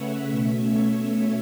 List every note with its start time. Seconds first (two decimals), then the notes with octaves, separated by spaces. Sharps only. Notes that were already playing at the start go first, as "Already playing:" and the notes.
Already playing: C#3 A3 C#4 B4 C#5 E5 F#5
0.29 B2 A3 C#4 E5
0.65 C#5
1.02 E5